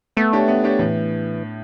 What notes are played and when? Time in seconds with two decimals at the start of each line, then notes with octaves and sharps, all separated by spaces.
0.17 A3 B3
0.33 D4 G4 C#5
0.48 B3
0.64 D4 G4 C#5
0.79 A2 E3